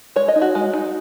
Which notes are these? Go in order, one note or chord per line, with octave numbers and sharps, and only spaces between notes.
G#3 C#5
D#5
D#4
F#4
G#3
D#4